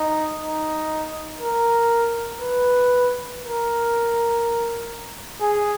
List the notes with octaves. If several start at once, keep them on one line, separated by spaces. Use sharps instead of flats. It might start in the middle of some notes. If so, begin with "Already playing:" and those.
Already playing: D#4
D#4
A#4
B4
A#4
G#4